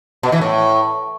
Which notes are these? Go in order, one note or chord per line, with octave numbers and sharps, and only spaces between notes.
B2
E3
A2